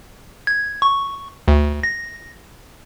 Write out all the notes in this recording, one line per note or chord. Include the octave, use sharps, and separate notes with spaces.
G#6
C#6
D2
A#6